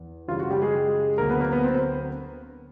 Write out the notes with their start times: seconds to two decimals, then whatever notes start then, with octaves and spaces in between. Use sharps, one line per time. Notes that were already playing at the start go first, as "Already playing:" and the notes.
Already playing: E2
0.28 F#2 C#3 E3 G3 F4
0.40 F#4
0.51 G3 G4
0.62 G#3 G#4
1.18 D2 D3 F#3 A#3 A#4
1.30 B3 B4
1.41 A#3 A#4
1.52 B3 B4
1.64 C4 C5